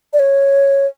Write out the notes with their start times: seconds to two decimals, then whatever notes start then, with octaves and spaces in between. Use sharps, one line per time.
0.13 D5
0.19 C#5